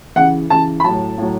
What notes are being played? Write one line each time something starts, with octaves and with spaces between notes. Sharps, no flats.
C#3 E3 F#5
C#3 E3 A5
B5
A2 F#3 A5
A2 F#3